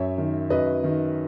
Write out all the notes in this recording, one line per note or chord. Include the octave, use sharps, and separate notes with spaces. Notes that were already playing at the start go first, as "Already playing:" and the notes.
Already playing: F#2 C#5 E5
D#3
F#2 B4 D#5
D#3